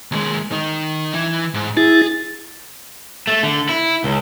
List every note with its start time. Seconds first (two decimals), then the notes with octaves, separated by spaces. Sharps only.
0.12 D#2 G#3
0.52 D#3 D#4
1.14 E3
1.54 G#2
1.77 E4 G#4 A6
3.27 A3
3.43 D3
3.69 E4
4.04 C#2